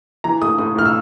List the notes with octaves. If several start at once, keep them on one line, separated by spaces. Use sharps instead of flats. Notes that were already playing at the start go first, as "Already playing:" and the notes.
E3 A#5
A3 D#6
A2 D#6
A2 F6
E6